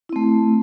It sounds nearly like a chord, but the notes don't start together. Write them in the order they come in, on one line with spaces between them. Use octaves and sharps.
E4 C4 A3